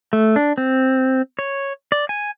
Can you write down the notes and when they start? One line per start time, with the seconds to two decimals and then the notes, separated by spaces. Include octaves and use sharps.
0.13 A3
0.36 D4
0.58 C4
1.39 C#5
1.92 D5
2.09 G#5